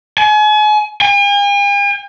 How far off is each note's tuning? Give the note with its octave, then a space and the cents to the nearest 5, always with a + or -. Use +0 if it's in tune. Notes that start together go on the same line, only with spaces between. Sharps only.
G#5 +35
G#5 -45